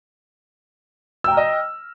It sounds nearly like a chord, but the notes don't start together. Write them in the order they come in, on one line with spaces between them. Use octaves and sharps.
E6 G5 A#5 F6 D#5